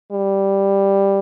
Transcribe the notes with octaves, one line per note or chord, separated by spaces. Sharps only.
G3